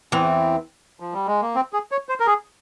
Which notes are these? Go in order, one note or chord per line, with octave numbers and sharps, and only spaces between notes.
E2 E3 C4
F3
G3
G#3
A#3
C4
G#4
C#5
C5
A#4
G#4